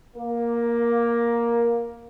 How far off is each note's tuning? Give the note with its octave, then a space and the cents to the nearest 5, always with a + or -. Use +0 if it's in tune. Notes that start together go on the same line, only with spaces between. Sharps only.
A#3 +10